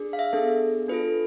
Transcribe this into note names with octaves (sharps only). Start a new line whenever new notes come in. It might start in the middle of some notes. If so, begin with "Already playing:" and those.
Already playing: D4 G#4
F5
E5
B3 D4 G#4 A4
D4 F4 A4 B4